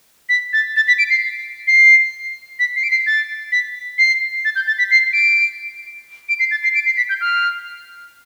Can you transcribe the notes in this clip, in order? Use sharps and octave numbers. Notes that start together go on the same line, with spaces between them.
B6
A6
A6
B6
D7
C7
C7
B6
C7
D7
C7
A6
B6
C7
A6
G6
A6
B6
C7
D7
D7
C7
A6
C7
D7
C7
B6
G6
F6